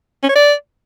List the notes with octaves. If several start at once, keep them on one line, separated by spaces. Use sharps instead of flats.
C#4
C#5
D5